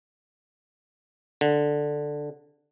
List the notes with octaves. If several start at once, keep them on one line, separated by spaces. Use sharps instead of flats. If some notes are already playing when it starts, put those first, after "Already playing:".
D3